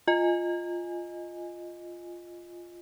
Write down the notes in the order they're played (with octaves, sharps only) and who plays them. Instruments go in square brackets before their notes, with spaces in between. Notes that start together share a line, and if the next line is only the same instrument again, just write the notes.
[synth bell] F4 D#5 G#5